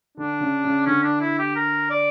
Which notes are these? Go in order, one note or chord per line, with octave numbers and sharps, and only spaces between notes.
D3 D4
C#3
C#3
D3 C#4
D4
E4
G4
A#4
D5